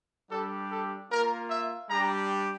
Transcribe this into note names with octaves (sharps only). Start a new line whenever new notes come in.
G3 D4 G4 A4
A4
A#3 F4 A#4
E5
G3 D4 G4 A#5